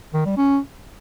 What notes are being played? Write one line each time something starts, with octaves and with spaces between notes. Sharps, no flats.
D#3
G3
C#4